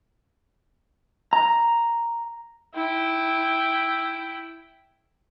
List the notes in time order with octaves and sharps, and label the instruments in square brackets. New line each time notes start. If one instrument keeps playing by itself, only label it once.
[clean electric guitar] A#5
[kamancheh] E4 G5